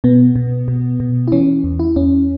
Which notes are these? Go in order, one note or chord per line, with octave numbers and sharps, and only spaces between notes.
B2 B3
B2
B2
B2
E4
E3 C#4
E2
E4
E2 C#4